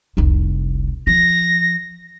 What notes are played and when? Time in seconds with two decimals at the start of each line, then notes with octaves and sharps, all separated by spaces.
0.17 F1 C2
1.07 F3 A#6